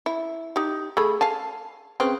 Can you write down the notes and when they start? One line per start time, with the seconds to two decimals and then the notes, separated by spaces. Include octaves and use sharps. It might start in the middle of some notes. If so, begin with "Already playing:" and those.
0.06 E4
0.56 D#4 G4
0.97 A3 G#4 B5
1.21 F5 G#5 A5
2.00 C#3 C4 B4